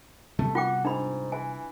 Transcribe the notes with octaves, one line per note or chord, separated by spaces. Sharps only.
C3 G3 A3 B3
F4 F#4 G5 D6
G#2 D4 B5
E3 G#5